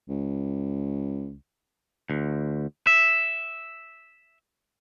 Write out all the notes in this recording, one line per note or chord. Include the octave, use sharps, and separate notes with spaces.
C#2
D2
E5